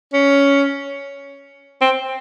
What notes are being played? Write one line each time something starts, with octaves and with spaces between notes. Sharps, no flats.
C#4
C4